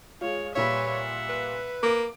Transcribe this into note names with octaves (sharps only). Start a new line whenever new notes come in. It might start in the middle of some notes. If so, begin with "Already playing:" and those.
G#3 F4 C#5
A#2 G3 B4 C#5 E5 F5
E5 F#5
B4
A#3 D6 D7